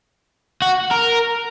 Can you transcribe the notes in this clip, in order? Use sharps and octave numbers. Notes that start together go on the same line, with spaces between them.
F#4
A#4